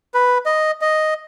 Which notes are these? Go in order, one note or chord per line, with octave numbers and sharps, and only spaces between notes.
B4
D#5
D#5